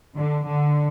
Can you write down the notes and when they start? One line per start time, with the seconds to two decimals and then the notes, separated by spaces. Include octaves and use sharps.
0.17 D3
0.47 D3